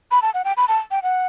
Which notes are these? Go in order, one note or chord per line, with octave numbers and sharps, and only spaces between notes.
B5
A5
F#5
G5
B5
A5
G5
F#5